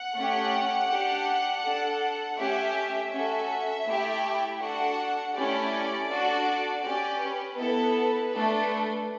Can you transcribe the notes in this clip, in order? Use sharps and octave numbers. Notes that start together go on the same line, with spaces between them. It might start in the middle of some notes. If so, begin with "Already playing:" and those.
Already playing: F#5
A3 C#4 G4
D4 G4
D4 A4
A3 C#4 G4 E5
C#4 F#4 A4 E5
A3 E4 G4
D4 F#4 A4 F#5
A3 C#4 E4 G4 D5
D4 F#4 A4
C#4 G4 D5
B4
B3 E4 A4
A3 D4 A4